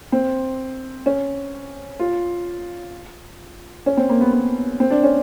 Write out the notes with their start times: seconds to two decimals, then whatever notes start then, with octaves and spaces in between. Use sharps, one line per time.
0.12 C4
1.06 C#4
1.99 F4
3.86 C#4
3.97 C4
4.09 A#3
4.21 B3
4.33 B3
4.80 C4
4.91 D4
5.03 C#4